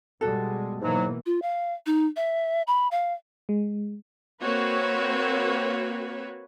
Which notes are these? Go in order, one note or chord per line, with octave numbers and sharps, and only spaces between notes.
B2 G3 G#3 F#4 A4
G#2 B2 E3 F#3 A#3
F4
F5
D#4
E5
B5
F5
G#3
A#3 C4 F#4 B4 C#5